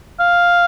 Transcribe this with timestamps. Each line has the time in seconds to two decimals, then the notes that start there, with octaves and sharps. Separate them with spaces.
0.20 F5